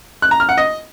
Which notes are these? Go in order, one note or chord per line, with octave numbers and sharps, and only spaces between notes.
F#6
A#5
F6
F#5
D#5